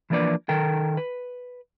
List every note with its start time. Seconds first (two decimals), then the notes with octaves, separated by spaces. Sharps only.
0.10 E3 F3 A#3 D4 B4 D5
0.49 D#3 A4 A#4 G5
0.97 B4